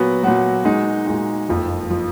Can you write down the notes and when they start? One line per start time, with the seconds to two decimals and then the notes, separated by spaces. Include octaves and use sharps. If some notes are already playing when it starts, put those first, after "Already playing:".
Already playing: A#2 F#3 B3 F#4
0.23 A#2 F#3 B3 F#4
0.64 A#2 G#3 D#4 F#4
1.07 A#2 G#3 D#4 F#4
1.49 F#1 F2 F3
1.90 F3